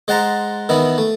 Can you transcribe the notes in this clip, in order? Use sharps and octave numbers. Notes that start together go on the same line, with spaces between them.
G#3 C5 F#5 A5 A#5
D#3 E3 B3 E4
A3